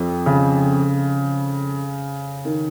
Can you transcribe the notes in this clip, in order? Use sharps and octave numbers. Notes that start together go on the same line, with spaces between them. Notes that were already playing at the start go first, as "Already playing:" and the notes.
Already playing: F2 F3
C#3
D#3